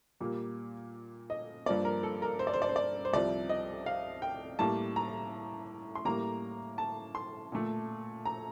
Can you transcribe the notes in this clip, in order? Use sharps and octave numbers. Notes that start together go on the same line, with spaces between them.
A#2 G3 A#3
D#5
G2 F3 A#3 D5
A#4
A4
A#4
C5
D5
C5
D5
C5
D5
C5
C2 C3 F3 D5
D#5
F5
G5
A2 G3 A#3 A5
A#5
C6
A2 G3 A#3 A#5
A5
C6
A#2 A3
A#5